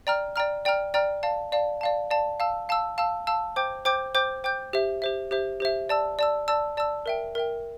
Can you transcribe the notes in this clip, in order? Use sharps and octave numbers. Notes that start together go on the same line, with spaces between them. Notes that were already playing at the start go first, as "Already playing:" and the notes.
D5 G5 A#5 F6
D5 G5 A#5 F6
D5 G5 A#5 F6
D5 G5 A#5 F6
D5 F5 A5
D5 F5 A5
D5 F5 A5
D5 F5 A5
F5 A5 E6
F5 A5 E6
F5 A5 E6
F5 A5 E6
C5 G5 D6 G6
C5 G5 D6 G6
C5 G5 D6 G6
C5 G5 D6 G6
G4 C5 E5
G4 C5 E5
G4 C5 E5
G4 C5 E5
D5 A5 E6
D5 A5 E6
D5 A5 E6
D5 A5 E6
A#4 E5 G5
A#4 E5 G5